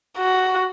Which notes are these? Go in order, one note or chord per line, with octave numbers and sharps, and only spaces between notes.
F#4